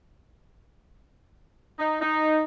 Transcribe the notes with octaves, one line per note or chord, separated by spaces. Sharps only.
D#4
D#4